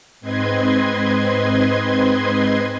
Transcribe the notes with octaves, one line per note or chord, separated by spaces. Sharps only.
G#2 C4 B4 D#5 C6 G#6